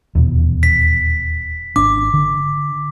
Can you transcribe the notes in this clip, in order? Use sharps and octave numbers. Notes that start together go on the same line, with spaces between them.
D#1 E2 B2
B6
G#1 D4 D6
D3